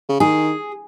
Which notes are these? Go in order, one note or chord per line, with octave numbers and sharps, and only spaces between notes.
C#3
D#3 G#4